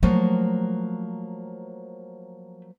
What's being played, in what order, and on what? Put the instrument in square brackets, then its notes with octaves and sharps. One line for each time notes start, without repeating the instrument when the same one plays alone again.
[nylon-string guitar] F3 F#3 A#3 [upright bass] A3